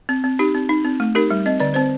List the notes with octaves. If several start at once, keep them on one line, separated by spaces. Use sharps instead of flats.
C4
C4
D#4 G4
C4
D#4
C4
A3
D#4 G4 A#4
G3
C4 D#5
D3 D5
C4 C5